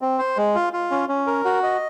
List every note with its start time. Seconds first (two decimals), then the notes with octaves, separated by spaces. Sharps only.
0.01 C4
0.19 C5
0.37 G#3
0.55 F4
0.73 F4
0.91 C#4
1.09 C#4
1.27 A#4
1.45 F#4
1.63 D#5